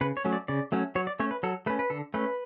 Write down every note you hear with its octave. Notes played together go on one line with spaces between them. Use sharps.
C#3 B4
C#5
F#3 A3 C#4
D5
C#3 D5
F#3 A3 C#4
F#3 C#5
D5
A3 C#4 C#5
B4
F#3 A4
A3 C#4 B4
B4
D3 A4
A3 C#4 B4